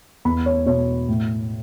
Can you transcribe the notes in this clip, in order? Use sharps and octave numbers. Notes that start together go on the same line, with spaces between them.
E2 B5
C#5
B2 C#5
A2